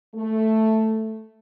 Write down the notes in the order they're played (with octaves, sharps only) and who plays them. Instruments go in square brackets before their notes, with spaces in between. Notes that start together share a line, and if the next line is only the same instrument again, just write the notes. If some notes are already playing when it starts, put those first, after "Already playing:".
[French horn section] A3